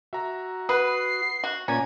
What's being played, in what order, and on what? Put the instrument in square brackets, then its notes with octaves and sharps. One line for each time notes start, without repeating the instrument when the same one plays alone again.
[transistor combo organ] F#4 [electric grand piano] E5 A#5
[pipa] B4 [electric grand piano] F#5 B5 D#6 [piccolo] C7
[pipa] F#4
[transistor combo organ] A#2 D5 G#5 [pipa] C#4 [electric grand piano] A#5 [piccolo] G#6